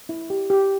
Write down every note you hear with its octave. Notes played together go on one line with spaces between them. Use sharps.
E4
G4
G4